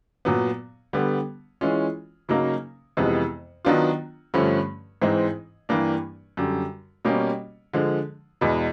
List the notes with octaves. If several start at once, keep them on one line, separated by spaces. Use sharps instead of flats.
A#2 F#3 B3
D3 G3 B3
E3 G#3 C#4 F4
C#3 F#3 A#3 D#4
F2 C3 E3 G#3 B3
D#3 F#3 B3 D4 F4
G2 D3 F3 A3 C#4
G#2 E3 G#3 C4 D#4
G2 E3 G3 A#3 D4
F#2 D3 G3
B2 G3 A#3 C#4
D3 F3 G#3
E2 B2 G#3